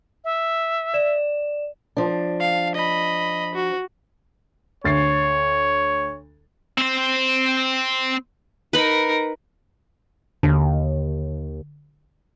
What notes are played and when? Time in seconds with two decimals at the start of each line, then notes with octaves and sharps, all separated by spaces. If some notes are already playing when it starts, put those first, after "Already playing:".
0.24 E5
0.94 D5 E7
1.97 F3 D4
2.40 F5
2.75 D#5 B5
3.55 F#4
4.84 D2 C#5 A6 C7
6.78 C4 C5
8.73 D#4 A#4 B4 B5
10.43 D#2 D3